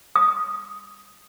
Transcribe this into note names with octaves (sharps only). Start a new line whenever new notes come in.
D#6